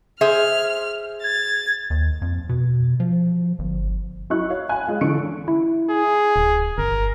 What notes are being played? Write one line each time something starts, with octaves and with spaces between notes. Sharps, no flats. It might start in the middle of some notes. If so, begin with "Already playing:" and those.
G#4 C5 E5 F6
G#6 A6
D#2
F2
B2
F3
G1
F#3 E4 D#5 C#6 F#6
C#5 F5
G5 G#5 B5 F#6
G#3 F4
D3 E3 C#6 C#7 D7
E4
G#4
D1
G1 A#4